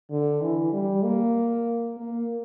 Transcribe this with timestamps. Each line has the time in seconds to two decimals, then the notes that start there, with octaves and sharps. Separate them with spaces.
0.10 D3
0.42 E3
0.73 G3
1.04 A#3
1.97 A#3